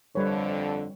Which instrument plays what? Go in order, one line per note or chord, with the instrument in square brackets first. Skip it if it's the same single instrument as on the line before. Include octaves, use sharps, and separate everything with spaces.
[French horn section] F2 D3 [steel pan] G3 B4 C#5